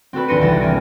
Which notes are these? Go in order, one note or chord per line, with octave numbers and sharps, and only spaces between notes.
C4 F#4 A4 B4
D#1 D4 C6 A#6 C#7 D#7
C2 E3 C4 A4 A6 A#6
E1 A#3 C4 G#5 D7